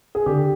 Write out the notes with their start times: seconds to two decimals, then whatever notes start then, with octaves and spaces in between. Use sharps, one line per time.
0.15 G#4
0.26 D3 G4